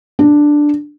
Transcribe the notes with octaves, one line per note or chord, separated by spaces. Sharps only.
D4